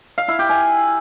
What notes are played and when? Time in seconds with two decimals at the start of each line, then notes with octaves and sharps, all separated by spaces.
0.18 F5
0.28 E4
0.39 G4
0.50 G#5